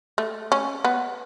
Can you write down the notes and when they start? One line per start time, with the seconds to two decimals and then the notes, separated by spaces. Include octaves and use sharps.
0.18 A3
0.52 C#4
0.84 B3